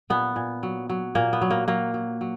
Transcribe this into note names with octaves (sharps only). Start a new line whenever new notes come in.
A#2 B3
A#2
F#3
F#3
A#2 A#3
B3
F#3
A#3
F#3 A#3
F#3
F#3